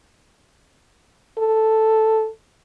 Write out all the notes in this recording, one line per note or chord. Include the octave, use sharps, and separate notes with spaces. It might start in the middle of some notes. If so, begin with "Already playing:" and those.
A4